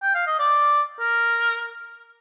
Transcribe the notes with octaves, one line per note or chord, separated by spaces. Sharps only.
G5
F5
D#5
D5
A#4